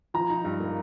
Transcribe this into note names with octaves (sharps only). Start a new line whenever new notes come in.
F3 A#5
D#4
G2
A#3